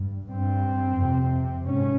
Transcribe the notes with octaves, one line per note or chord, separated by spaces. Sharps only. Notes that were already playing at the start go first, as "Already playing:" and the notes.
Already playing: G2
G2 C4
F2 C3
G#2 C#4